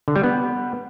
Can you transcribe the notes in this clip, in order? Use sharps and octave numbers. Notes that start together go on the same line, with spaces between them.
D3
G3
B3